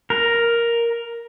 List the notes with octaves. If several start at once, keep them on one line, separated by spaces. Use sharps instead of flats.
A#4